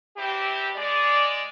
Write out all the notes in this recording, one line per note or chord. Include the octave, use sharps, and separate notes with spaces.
E2 C4 E4 G4
G#3 D5